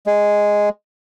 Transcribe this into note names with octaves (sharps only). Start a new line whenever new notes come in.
G#3